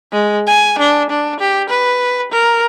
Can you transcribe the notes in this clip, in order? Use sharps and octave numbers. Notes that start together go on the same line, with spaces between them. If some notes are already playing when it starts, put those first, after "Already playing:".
G#3
G#5
D4
D4
G4
B4
A#4